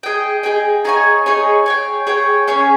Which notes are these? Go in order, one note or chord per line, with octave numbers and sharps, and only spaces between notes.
G#4 D#5 G5
G#4 D#5 G5
D#4 G#4 C#5 G#5
D#4 G#4 C#5 G#5
G#4 C#5 G5
G#4 C#5 G5
C#4 G#4 C#5 G#5